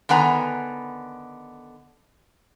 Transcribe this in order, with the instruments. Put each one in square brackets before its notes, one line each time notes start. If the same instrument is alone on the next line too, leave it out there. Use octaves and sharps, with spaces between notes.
[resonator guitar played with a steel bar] D3 D#3 B3 G#5 A#5